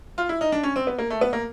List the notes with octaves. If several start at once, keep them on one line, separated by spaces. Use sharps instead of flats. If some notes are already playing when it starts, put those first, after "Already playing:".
F4
E4
D#4
D4
C#4
C4
B3
A#3
A3
B3
A#3